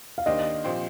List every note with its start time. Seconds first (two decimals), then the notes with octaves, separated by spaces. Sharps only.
0.18 F5
0.26 D#3 A#3 D4 G4 C5 D#5
0.64 A#2 F3 C4 G4 C5